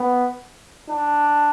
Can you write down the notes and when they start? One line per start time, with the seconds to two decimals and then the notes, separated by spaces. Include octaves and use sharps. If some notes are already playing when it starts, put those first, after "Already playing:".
Already playing: B3
0.90 D4